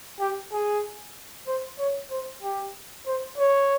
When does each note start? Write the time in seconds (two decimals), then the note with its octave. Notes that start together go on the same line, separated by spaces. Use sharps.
0.20 G4
0.52 G#4
1.47 C5
1.79 C#5
2.11 C5
2.43 G4
3.06 C5
3.38 C#5